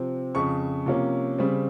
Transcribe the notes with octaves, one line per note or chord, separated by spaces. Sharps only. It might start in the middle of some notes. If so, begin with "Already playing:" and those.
Already playing: C3 F3 C4
F2 C#3 F3 C#6
C3 F3 A#3 C#4
C#3 G3 C4